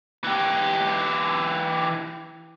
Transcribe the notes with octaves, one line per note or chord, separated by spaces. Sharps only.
E3 G4